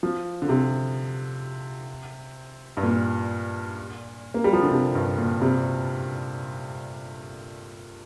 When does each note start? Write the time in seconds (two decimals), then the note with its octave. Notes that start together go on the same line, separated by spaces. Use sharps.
0.03 F3
0.42 D3
0.49 C3
2.77 G2
2.83 A#2
4.34 A#3
4.44 G3
4.53 F3
4.62 D3
4.71 C3
4.95 G2
5.18 A#2
5.42 C3